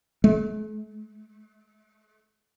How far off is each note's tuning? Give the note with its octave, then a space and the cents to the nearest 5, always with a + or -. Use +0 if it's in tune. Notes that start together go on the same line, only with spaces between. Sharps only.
A3 -45